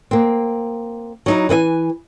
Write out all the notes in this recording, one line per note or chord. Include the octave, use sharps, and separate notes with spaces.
A#3 C4
F#3 D#4 E4
E3 B4 D#5 G#5